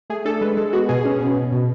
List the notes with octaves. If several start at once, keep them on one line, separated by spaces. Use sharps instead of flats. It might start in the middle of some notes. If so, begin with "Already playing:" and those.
A3 G#4
D4 A4
G#3 B4
G#3 A4
B3 F#4
B2 G#4
C#4
B2
B2
B2